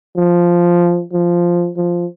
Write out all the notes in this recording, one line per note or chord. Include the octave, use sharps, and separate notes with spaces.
F3
F3
F3